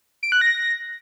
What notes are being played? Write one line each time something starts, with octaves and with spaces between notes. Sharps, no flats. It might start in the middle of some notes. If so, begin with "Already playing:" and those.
D7
F#6
A#6